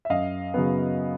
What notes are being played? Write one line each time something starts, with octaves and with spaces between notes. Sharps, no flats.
E5
F#2 D#5 F5
C#3 F#3 B3